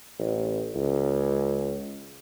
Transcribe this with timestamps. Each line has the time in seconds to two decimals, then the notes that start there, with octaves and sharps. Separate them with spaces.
0.19 A1
0.75 C#2